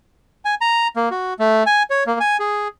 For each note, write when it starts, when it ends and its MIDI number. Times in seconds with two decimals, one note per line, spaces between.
0.45 0.55 80
0.61 0.88 82
0.96 1.09 58
1.11 1.34 66
1.39 1.63 57
1.66 1.83 80
1.90 2.04 73
2.07 2.19 58
2.20 2.37 80
2.40 2.68 68